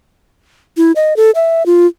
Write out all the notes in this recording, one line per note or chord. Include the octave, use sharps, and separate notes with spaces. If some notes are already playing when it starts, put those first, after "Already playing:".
E4
D#5
A4
E5
F4